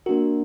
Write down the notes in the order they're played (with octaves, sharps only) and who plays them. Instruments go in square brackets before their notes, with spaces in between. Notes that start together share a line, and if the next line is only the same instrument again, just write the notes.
[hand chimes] A#3 D4 A#4 [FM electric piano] F#4